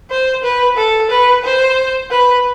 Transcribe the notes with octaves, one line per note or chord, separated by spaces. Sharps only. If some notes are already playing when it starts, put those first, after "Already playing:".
C5
B4
A4
B4
C5
B4